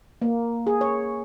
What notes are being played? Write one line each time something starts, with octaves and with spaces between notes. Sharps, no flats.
A#3
G#4
C#5